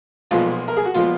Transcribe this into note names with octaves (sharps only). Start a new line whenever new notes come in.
B1 A#2 F3 G#3 B3 F4
A#4
G#4
F#4
A#2 F3 G#3 B3 F4